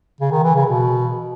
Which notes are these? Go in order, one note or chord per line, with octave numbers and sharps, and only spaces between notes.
C#3
D#3
E3
C#3
B2